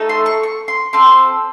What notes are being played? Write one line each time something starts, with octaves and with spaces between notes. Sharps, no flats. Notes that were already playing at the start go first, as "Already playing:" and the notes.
Already playing: A3 D#4 A4
C6
C#6
C#6
C6
C4 F4 A4 C6